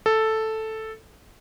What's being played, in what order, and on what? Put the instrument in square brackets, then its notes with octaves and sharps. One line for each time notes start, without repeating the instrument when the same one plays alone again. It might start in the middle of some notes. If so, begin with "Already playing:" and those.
[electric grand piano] A4